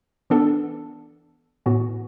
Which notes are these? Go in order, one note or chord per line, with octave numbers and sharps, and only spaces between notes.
E3 B3 D4 A4
A2 E3 B3 F#4